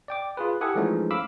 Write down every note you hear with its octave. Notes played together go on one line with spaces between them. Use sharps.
D5 G5 D6
F4 G#4 B4
E4 G4 A4 F#5 G#5 D#6
E3 F3 G#3 A3 C#4 D#4
F5 B5 D6 E6